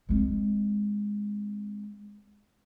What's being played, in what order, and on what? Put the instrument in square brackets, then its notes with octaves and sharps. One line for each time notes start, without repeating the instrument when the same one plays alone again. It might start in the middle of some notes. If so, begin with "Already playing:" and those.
[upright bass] G#3 C4